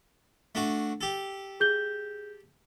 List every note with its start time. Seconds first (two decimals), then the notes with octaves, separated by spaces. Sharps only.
0.55 A3 D4 F#4
1.01 G4 A4
1.60 G#4 G6 G7